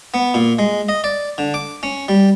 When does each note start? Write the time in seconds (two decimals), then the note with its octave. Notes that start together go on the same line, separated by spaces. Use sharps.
0.14 B3
0.34 A#2
0.59 G#3
0.89 D#5
1.04 D5
1.38 D3
1.54 D6
1.83 C#4
2.09 G3